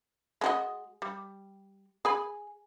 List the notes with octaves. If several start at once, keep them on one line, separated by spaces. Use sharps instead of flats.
G#3 F#4 D#5
G3
G#4 G#5 B5